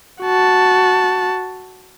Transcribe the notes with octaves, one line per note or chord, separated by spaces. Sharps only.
F#4 A5